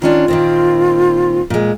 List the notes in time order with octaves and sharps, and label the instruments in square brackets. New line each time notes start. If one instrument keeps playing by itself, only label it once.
[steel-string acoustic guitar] D#3 C#4 D4 [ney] F4
[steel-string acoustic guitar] A#2 D#3 C4
A#2 G#3